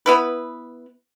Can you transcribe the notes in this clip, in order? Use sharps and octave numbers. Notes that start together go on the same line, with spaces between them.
B3 E4 B4